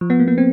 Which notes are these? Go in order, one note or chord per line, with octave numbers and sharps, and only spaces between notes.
F3
B3
A#3
B3
C4